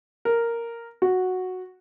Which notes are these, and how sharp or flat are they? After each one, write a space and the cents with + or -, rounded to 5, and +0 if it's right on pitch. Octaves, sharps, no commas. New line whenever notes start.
A#4 -5
F#4 -5